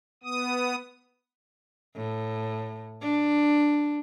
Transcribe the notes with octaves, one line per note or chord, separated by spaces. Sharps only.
B3 D#6
A2
D4